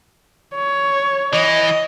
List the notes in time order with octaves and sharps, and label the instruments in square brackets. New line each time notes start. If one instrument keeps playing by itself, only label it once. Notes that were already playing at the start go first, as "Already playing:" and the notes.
[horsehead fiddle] C#5
[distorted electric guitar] E3 [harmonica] D#5